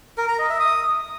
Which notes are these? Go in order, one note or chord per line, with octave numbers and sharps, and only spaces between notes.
A#4
A#5
D#5
E5
D#6